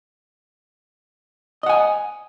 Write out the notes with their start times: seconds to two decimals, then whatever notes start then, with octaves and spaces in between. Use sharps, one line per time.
1.63 D#5
1.66 F#5
1.69 G#5